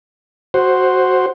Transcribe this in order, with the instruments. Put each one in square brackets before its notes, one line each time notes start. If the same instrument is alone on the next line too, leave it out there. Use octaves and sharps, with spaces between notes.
[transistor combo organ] F#4 C5